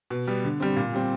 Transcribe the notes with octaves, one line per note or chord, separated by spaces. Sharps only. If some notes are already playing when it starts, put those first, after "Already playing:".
B2
G3 B3
D3
G3 C4
A#2
G3 C4